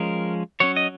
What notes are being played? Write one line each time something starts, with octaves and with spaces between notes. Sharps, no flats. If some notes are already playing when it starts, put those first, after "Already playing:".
Already playing: F3 G#3 C#4 A#4
F#3 C#4 C#5
D#5